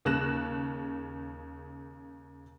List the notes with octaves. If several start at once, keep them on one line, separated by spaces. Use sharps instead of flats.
D#2 C#3 F#6 A#6 E7